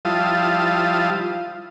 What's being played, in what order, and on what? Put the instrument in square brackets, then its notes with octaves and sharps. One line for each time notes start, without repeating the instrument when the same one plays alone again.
[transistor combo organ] F3 G3 E4 F4 A5 D#6